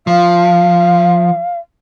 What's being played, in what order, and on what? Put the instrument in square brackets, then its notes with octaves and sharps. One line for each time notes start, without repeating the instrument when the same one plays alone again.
[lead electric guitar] F3 [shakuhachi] F5